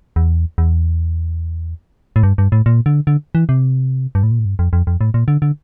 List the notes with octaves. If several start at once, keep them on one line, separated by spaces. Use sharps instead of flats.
E2
E2
A2
G2
G2
A2
A#2
D3
D3
E3
C3
G2
A2
A#2
A2
G2
F2
F2
F2
A2
A#2
D3
D3